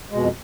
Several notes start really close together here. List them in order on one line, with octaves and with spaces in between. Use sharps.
G#3 B2 F2